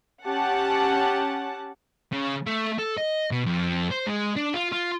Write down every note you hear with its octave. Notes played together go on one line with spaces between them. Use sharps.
C#4 G4 F#5 A5
C#3
A3
A4
D#5
B2
F2
C5
G#3
D4
F4
F4